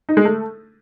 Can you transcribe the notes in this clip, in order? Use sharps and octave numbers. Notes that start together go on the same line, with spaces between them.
D#4
G#3
A3